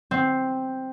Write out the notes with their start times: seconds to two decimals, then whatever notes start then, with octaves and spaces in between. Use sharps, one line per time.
0.11 C4